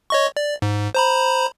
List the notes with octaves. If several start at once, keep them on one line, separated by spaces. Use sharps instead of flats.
C#5 D#5 C#6
D5
G#2
C5 A#5 B5